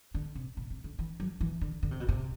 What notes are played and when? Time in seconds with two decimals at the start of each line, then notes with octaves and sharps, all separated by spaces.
0.14 D3
0.35 C3
0.57 B2
0.70 C3
0.84 D3
0.99 E3
1.20 F#3
1.41 E3
1.61 D3
1.83 D3
1.91 C3
2.00 B2
2.09 C3